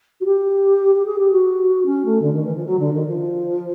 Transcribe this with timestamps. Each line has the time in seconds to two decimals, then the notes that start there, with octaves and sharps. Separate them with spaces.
0.20 F#4
0.25 G4
0.95 G4
1.05 G#4
1.18 G4
1.32 F#4
1.85 C#4
2.05 A3
2.21 D3
2.33 D#3
2.44 E3
2.55 F3
2.66 F#3
2.79 D3
2.93 D#3
3.06 F3